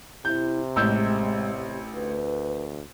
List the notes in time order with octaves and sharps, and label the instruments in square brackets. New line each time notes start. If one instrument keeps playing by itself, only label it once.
[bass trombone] C3 [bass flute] E4 [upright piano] G6
[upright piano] A1 E6 G6 [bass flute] G#3
[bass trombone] D2 [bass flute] B4